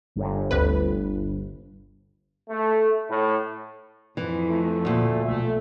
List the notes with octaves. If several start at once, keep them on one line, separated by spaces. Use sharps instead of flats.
G1
D2 C3 B4
A3
A2
F2 E3
A3
D2 A#2
B1 A3 E5